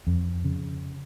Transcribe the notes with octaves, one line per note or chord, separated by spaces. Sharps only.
F2
C#3